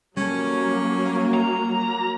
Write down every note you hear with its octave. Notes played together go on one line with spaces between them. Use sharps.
F#3 G3 A#3 C#4 A4
A#5